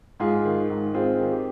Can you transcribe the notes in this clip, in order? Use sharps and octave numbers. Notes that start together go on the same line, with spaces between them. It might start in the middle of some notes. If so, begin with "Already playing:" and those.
G#2 F4 G#4
D#3
G#2
C4 F4 G#4
D#3
G4